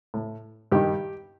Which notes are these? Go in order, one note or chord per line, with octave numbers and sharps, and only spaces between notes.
A2
G2 D#3 G4